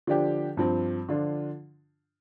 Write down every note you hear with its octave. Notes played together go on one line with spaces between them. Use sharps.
D3 F3 D4 G4
G2 F3 C4
D3 F3 D4 F4